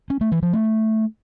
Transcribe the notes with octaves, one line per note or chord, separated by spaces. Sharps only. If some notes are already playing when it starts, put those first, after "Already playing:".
C#4
A3
E3
F3
A3